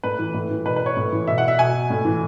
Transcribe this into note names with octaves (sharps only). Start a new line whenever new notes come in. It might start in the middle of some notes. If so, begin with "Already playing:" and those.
A2 B4
E3
A2
E3
B2 B4
B4
C#5
A2
E3
B2 E5
F#5
E5
B2 G#5
A2
E3